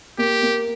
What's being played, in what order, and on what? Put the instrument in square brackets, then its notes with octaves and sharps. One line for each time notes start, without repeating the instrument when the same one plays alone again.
[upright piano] A#3 [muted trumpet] G4
[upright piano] A#3